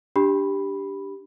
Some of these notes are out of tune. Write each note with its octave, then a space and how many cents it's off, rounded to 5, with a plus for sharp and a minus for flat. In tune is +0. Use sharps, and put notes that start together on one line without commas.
D4 +0 G4 +0 B5 +0